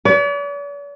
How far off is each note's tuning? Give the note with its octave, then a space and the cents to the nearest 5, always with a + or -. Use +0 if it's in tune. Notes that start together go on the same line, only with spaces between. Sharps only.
B4 +0 D5 -45